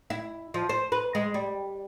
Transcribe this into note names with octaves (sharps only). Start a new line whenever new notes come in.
E4
F3
C5
B4
G#3
G3